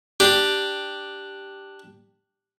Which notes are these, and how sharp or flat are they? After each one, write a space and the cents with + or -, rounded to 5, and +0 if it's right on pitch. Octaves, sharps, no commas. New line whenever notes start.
D4 +5 G4 +0